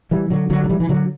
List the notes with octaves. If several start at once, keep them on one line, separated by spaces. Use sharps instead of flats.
E3 G3
D3 F#3
D3 F#3
F#3
E3 G3
E3
D3 F#3